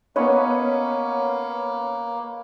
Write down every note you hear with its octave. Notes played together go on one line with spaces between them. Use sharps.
A#3 B3 C#4 B4 C#5 D#5